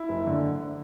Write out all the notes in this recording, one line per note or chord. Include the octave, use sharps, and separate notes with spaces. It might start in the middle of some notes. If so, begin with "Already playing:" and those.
Already playing: E4
F#1
D3